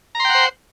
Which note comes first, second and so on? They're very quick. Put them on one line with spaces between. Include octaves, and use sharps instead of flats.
A#5 C6 G5 F#5 C5